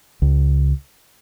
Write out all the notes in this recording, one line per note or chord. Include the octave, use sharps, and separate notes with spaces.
C#2